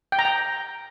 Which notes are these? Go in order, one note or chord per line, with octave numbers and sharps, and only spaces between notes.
G5
A#5
G5